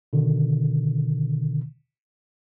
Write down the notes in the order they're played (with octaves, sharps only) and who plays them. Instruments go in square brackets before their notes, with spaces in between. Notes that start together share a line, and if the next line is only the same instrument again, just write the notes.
[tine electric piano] B2 D3 D#3